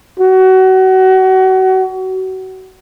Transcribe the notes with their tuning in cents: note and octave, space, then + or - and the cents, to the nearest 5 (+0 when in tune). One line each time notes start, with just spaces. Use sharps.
F#4 +30